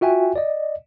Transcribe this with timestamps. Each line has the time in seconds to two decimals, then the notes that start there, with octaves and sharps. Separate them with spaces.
0.01 F4 F#4 E5 G5 G#5
0.36 D5 D#5